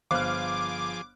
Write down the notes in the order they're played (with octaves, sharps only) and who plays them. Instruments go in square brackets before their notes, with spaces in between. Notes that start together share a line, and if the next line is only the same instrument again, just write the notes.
[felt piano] G1 C5 F#6 [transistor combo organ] F3 G#4 [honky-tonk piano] F5 F6 [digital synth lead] D6